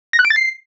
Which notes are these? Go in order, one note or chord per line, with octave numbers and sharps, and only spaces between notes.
A#6
F#6
D7
A6
C7